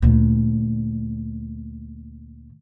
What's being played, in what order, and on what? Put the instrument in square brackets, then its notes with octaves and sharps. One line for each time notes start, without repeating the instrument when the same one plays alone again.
[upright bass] D2 A#2